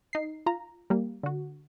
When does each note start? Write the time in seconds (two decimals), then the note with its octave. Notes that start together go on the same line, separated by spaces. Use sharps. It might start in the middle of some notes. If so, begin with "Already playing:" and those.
0.13 D#4 C7
0.46 F4 A#5
0.90 G3 A#3
1.23 D3 F#4